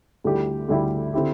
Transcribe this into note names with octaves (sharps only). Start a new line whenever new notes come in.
D2 D3 G3 E4 G4
D2 D3 G3 E4 G4
D3 C4 E4 G4